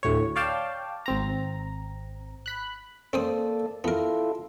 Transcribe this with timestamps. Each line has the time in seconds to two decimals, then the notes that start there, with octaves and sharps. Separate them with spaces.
0.03 D2 A2 C#5
0.36 C#5 D5 F5 G5 A5
1.06 G#1 C4 A#5
2.46 B5 F#6
3.13 A#3 C4 A4 C5 D5 D#6
3.84 B3 E4 F4 A4 A#4